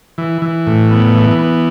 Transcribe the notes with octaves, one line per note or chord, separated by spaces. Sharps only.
E3
E3
A2
B3
E3
B3